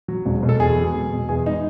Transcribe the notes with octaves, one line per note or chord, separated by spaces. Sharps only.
F#3
E1
B2
A4
E2 G#4
F#3
E1
B2
E2 G#4
G#3 D#4